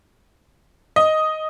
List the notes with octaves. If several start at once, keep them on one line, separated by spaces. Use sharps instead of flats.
D#5